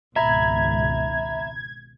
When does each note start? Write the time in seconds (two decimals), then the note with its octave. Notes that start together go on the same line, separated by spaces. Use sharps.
0.16 G#1 C#2 B2 E5 A#5 B5 G#6